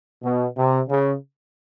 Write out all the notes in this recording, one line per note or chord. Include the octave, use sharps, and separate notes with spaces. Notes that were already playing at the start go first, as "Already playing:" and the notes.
B2
C3
C#3